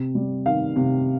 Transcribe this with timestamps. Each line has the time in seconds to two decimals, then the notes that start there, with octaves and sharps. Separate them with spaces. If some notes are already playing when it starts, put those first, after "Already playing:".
Already playing: C3
0.15 G3
0.46 D#3 F5
0.76 C3